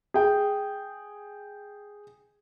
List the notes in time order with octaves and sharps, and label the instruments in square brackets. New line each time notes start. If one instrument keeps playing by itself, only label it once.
[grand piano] G#4 G5